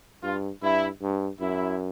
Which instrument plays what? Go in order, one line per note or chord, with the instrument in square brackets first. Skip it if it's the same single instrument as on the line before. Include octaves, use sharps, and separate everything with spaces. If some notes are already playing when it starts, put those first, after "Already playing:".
[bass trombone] G2 [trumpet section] F4
[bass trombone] G2 [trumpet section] E4
[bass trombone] G2
[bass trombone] F#2 [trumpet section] E4